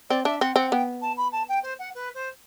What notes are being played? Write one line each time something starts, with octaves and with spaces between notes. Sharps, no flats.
C4 D5
D4 E5
C4 F#5
C4 F#5
B3 G5
A5
B5
A5
G5
C5
F#5
B4
C5